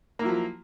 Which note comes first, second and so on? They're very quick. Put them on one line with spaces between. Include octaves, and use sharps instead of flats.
A#3 E4 F#3 F3